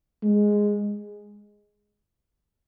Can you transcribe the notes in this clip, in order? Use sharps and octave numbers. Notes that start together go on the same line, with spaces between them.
G#3